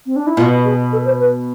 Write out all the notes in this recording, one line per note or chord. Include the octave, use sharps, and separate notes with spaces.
C4
D4
E4
B2 F4
G#4
A4
C5
B4